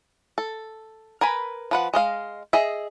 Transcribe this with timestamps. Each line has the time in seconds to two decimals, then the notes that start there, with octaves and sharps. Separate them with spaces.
0.38 A4
1.21 A#4 B4 G#5 B5
1.71 F3 B4 F#5
1.94 G#3 D#5 F5
2.53 G#4 D#5 E5